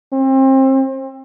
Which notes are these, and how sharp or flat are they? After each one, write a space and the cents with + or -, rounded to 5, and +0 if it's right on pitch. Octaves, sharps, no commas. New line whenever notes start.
C4 +30